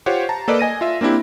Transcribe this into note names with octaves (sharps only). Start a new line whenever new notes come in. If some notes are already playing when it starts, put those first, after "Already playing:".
F4 G4 C5 C#5 F#5
A5 A#5
A#3 A4 B4 D5 D#5
D#5 G#5 A#6 D#7
F4 E5
A#3 C4 D4 E4 G4